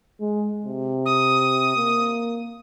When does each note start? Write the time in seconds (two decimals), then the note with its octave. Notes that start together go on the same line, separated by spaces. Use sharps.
0.20 G#3
0.65 C3
1.06 D#6
1.76 A#3